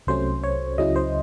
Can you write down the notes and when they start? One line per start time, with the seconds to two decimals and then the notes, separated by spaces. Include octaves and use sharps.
0.07 C2 C3 F#3 A3 C#4 C5
0.44 C#5
0.78 C#2 C#3 F#3 C#4 E4 D#5
0.96 C5